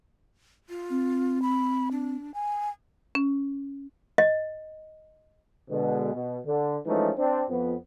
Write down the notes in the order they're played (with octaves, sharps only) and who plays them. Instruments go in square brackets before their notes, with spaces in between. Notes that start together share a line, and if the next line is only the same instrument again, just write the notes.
[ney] F4
[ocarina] C4
[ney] B5
D4
G#5
[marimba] C#4
[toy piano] D#5
[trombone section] B2 D3 G#3
B2
D3
E3 F3 G#3 A3 C#4 D#4
C4 D4
F2 B3